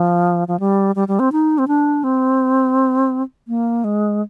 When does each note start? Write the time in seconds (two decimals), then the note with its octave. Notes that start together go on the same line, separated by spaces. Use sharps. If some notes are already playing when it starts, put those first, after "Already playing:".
Already playing: F3
0.48 F3
0.60 G3
0.96 G3
1.08 G3
1.19 C4
1.32 D#4
1.58 C4
1.68 D4
2.04 C4
3.48 A#3
3.84 G#3